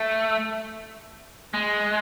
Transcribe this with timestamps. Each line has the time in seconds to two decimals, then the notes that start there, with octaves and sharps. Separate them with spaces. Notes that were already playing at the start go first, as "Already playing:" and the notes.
Already playing: A3
1.54 G#3